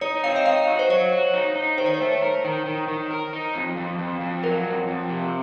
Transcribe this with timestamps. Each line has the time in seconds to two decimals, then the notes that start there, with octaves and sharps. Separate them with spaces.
0.01 D#4 C#5
0.24 C4 F5
0.36 D#5
0.45 D#4 F5
0.67 F#4
0.79 C5
0.89 F#3 C#5
1.12 F#4
1.34 D#4
1.55 D#4
1.77 D#3 C5
1.86 C#5
1.94 C5
2.00 A3
2.22 A#4
2.44 D#3
2.66 D#3
2.88 D#3
3.11 A#4
3.33 D#4
3.55 F2
3.76 F2
3.99 F2
4.20 F2
4.43 F#3 A#4
4.65 F2
4.88 F2
5.09 C3